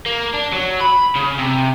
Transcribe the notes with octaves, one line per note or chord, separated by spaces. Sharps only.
A#3
D4
F#3
B5
C#3
C3